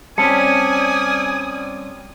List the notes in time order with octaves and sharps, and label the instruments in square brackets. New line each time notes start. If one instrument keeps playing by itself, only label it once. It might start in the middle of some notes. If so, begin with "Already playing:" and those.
[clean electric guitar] G3 C4 C#4 [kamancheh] D5 D#6 [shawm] G#5 [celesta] A5 C#7